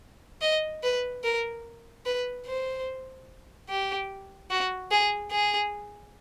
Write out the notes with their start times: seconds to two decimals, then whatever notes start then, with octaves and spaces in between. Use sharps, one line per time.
0.42 D#5
0.84 B4
1.24 A#4
2.06 B4
2.46 C5
3.69 G4
4.51 F#4
4.91 G#4
5.32 G#4